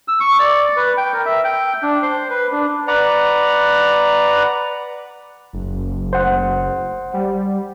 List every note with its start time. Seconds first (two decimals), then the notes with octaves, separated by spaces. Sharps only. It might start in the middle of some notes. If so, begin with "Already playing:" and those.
0.08 E6
0.20 C#6
0.39 D5
0.76 B4
0.97 G5
1.13 A#4
1.26 E5
1.44 G5
1.83 D4
2.02 C5
2.30 B4
2.52 D4
2.88 B4 D5 F#5 A#5
5.53 F#1
6.13 C5 F#5
7.14 G3